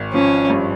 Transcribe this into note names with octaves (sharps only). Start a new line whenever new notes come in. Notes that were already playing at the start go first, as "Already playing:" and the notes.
Already playing: G#1
F3 C#4
G2